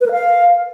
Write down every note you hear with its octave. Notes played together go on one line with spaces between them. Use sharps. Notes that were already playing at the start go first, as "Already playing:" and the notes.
B4
A#4
F5